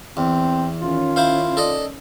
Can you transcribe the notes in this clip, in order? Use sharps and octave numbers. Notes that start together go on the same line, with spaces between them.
E2 C4
D#3 C#4 F4
E4 C5 F5
A4 D5 D#5